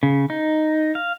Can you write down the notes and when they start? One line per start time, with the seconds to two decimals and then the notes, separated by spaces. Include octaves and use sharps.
0.03 C#3
0.30 D#4
0.95 F5